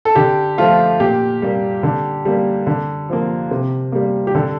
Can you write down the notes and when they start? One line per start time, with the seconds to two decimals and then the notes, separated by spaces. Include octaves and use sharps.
0.05 A4
0.15 D3 G4
0.58 F3 A3 F4
1.00 A#2 G4
1.42 G3 A#3
1.83 D3
2.25 G3 A#3
2.67 D3
3.10 F3 A#3
3.51 C3
3.92 G3 A#3
4.27 G4
4.35 D3 A4